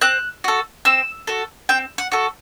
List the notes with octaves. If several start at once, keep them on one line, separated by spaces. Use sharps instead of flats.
C4 F#6
F#4 A4
C4 E6
F#4 A4
C4 G5
F#5
F#4 A4